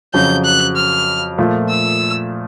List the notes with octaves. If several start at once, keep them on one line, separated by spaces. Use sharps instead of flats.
F2 C#3 F#3 G6
F#6
F6
A#2 F3 A3
E6